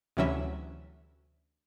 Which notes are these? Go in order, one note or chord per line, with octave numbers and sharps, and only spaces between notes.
D2 C3 E3 F#3 C#4 E5